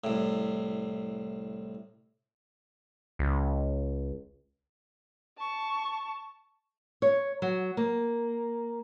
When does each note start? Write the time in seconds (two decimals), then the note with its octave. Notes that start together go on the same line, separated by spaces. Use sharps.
0.04 C2 A2
3.19 C#2
5.38 A5 C#6
7.02 C#5
7.42 F#3
7.77 A#3